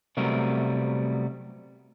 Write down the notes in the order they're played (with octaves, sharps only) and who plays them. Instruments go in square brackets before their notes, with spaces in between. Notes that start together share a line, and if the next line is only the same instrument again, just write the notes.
[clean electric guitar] C3 F#3 G3 A3 B3 A#4